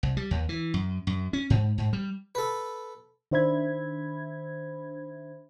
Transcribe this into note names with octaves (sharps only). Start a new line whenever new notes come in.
C2
G3
D#2
E3
F#2
F#2
C#4
G#2
G#2
G3
A4 B4
D#3 D4 C5 E5 B5 G#6